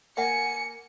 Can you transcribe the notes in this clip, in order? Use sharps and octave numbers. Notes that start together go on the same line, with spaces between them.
A#3 E5 F#5 G#5 C#7